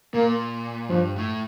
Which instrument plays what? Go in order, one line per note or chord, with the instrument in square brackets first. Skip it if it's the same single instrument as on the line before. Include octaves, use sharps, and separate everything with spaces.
[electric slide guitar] A#2 [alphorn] A#3
[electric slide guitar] G2 [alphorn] F3
[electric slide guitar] A2